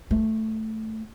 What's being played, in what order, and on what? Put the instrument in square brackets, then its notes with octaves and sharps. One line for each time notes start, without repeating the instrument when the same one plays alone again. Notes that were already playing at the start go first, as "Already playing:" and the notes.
[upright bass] A3